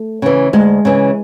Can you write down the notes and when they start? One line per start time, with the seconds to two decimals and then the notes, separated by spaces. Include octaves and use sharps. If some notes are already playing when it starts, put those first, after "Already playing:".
Already playing: A3
0.22 C#3 E3
0.53 D2 G#3
0.85 C#3 E3